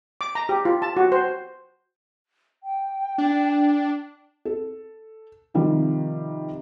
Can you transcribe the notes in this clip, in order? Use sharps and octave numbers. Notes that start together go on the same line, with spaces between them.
D6
A#5
G4
F4
A5
F#4
C5
G5
D4
A4
C3 D#3 F3 G3